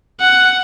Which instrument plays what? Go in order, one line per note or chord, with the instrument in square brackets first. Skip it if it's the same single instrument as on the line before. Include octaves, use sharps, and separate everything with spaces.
[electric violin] F#5